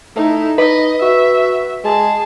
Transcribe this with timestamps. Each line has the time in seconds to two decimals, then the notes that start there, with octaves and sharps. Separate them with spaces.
0.16 A3 D#4 E4
0.58 D#4 B4 D#5
1.02 F#4 E5
1.84 G#3 G#4 A5